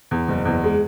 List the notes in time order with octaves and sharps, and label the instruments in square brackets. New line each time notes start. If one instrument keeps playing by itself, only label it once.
[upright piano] E2
F#1
E2
G#3